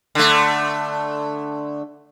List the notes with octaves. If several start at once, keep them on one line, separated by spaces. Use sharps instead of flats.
D3 A3